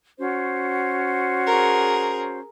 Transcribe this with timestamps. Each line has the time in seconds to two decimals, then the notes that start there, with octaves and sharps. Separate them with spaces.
0.18 C#4 F#4 C5
1.46 G#4 A#4